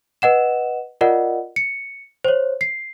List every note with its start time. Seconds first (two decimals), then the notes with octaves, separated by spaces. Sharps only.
0.22 B4 D#5 F#5 E7
1.01 F4 A#4 D5 D#5 F#5
1.56 C#7
2.25 C5 C#5
2.61 C7